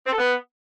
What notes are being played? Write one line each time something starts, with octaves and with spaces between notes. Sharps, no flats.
C4
A4
B3